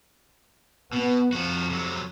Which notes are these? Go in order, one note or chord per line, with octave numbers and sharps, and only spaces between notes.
B2 B3
F2 F3 F#4
C3 F#3